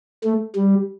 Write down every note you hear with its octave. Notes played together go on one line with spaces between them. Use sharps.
A3
G3